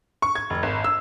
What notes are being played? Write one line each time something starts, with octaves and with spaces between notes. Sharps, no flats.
C#6
G#6
F1
G#1
E6